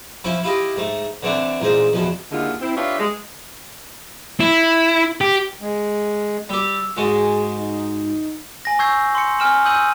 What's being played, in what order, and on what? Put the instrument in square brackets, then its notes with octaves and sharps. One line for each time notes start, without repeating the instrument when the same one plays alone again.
[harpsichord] F3 C#4 E4 F4
E4 F4 G4 D#5
G#2 A3
D3 E3 A3 C4 D4
A1 A#2 G#3 C5
E2 B2 F3
[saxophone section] D#2 D3 G#3 E4 F4 F#5
C4 E4
D4 F4 G4 B4 C#5 E5
G#3
[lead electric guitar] E4
G4
[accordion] G#3
[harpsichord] G3 G4 [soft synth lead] E6
[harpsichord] G#2 G#3 F#4 [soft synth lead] G#4
[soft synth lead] D#4
[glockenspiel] G#5 A#6
C#6 E6 G6 G#6 C7
C6 C#7
G#5 F6 E7 F#7
D#6 E6 G6 D#7 F#7